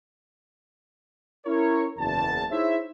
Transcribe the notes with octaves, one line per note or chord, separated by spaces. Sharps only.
C#4 E4 A#4 C#5
F#1 E2 A5
D#4 E4 G#4 C5 C#5 E5